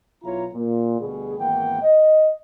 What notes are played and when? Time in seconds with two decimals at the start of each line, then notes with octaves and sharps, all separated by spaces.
0.23 B1 E4 F4 C#5 A#5
0.53 A#2
1.00 D2 B2 G3 G#4
1.39 G#1 E2 A#3 F#5 G5
1.82 D#5